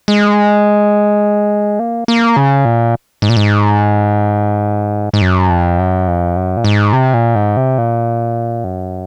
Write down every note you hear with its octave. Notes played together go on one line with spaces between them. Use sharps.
G#3
A#3
A#3
C#3
A#2
G#2
A#2
G#2
G#2
F#2
F2
F#2
F2
F#2
A#2
G#2
C3
A#2
G#2
C3
A#2
F#2